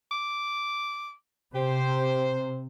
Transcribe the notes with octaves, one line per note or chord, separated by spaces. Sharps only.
D6
C3 G4 C5